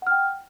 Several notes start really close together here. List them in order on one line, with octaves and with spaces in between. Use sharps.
F#5 F6 G5